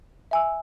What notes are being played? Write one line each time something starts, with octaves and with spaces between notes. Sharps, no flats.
E5 G#5 E6